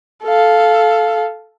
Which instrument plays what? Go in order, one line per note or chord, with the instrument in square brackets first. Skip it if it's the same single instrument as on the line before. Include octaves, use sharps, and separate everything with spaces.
[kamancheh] A4 F5